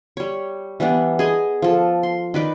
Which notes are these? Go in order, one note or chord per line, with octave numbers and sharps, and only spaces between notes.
G3 C#5
E3 G3 B3 D4
G#4 D#5 G#5
F3 A4
C6
D#3 B4 D5